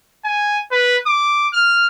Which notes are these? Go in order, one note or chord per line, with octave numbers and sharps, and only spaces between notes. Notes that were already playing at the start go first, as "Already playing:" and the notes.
G#5
B4
D6
F6